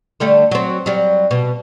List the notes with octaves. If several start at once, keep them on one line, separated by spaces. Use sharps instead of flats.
D3 G3 A3
F#3 C4
F#3 G3
B2